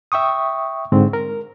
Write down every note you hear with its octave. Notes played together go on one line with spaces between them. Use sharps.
E5 G5 C#6 D#6
G#2 D3 C4
A#4